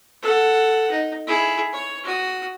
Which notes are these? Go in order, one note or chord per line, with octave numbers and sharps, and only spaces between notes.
A4 F#5
D#4
E4 G#4
C#5
F#4 D#6